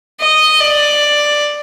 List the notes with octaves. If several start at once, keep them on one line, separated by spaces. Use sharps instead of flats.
D#5
D5